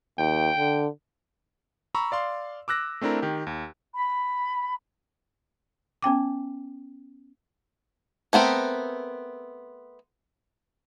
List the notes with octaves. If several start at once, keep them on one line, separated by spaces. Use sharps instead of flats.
D#2 G5
D3
A#5 B5 C#6 E6
D5 F5 C6
D6 E6 F#6 A#6
A3 C4 D4 E4 A#4
D#3 G4
D#2
B5
B3 C#4 G5 D6
A3 B3 C4 A#4